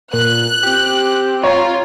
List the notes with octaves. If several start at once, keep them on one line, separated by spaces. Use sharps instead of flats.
A#2 F#6
C4 G4
F4 C#5 A#5